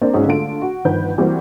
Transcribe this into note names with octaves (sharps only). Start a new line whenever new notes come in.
A#3 C4 D4 D5
B1 G#2 C#4 D#4 G#4
D3 G#3 A3 F4 D7
F#4
G1 D#3 F3 B4 F#5 G6
E3 G3 A#3 C4 F#4